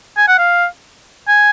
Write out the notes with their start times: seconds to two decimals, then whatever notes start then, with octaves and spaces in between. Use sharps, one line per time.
0.18 G#5
0.28 F#5
0.38 F5
1.28 G#5